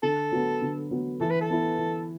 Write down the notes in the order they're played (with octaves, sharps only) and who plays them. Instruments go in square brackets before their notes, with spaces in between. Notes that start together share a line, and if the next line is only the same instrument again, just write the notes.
[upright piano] D3 [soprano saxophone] A4
[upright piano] F#3 B3
D3
F#3 B3
[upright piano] E3 [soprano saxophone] A4
[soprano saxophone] B4
A4
[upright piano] B3 E4 B4
E3